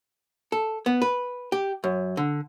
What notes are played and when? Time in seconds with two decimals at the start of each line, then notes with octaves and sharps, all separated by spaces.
0.52 A4
0.86 B3
1.02 B4
1.52 G4
1.84 F#2
2.17 D3